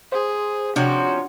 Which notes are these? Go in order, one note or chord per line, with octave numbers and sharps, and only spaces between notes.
G#4 C5
C3 F3 C#4 D4 F#4